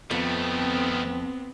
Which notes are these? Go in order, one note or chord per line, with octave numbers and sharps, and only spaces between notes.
F2 D#3 A3 B3 C4